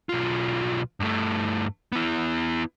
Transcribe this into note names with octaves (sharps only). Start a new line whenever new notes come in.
B1 F4
G2 A3
B3 E4